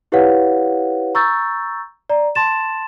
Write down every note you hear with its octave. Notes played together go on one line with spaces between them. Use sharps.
E4 G4 B4 C#5 F5 F#5
A#5 C#6 E6 G6 A6
D5 A#5
A5 C6 A6 E7